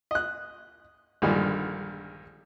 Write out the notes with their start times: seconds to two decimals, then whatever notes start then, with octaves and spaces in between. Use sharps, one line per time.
0.11 D#5 F#6
1.22 A#1 G2 D3 D#3 G3 G#3